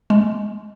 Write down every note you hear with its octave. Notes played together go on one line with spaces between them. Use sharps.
G#3